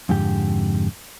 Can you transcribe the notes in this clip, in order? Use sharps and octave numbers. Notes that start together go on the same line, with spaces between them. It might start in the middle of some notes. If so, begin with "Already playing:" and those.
F2 G#2 D3 G4